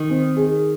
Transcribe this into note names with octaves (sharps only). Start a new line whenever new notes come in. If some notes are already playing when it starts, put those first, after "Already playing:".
Already playing: D#3
C4
G#4